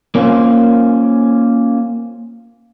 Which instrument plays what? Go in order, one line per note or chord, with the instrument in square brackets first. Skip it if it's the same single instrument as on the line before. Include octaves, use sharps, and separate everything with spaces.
[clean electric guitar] A#3 C#4 F4 C5